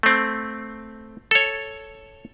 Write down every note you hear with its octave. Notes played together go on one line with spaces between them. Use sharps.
A3 C4
A4 C#5